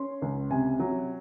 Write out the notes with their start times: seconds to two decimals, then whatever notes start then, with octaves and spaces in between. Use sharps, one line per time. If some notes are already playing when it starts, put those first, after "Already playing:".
Already playing: C#4 C6
0.22 C#2
0.50 C3 G#5
0.80 F#3